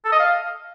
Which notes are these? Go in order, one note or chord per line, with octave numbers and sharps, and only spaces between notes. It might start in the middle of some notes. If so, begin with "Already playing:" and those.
A4
D#5
F5